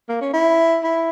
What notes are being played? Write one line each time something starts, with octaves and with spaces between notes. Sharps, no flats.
A#3
C#4
E4
E4